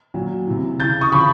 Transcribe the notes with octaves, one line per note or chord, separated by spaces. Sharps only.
A#2 F#3
C3 E3
C#3 E3 G6 A6
C#6 D#6
C#3 F3 B5 C#6